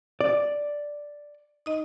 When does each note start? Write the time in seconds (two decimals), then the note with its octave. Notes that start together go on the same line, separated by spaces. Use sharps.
0.21 D5
1.66 D#4 D#5